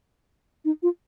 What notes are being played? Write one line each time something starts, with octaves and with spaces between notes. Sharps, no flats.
D#4
F4